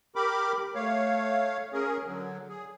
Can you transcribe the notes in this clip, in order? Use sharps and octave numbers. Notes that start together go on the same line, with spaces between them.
G4 A#4 B5 D6
A3 C#5 F5
C#4 G#4 A#4
D3 F#3
G#4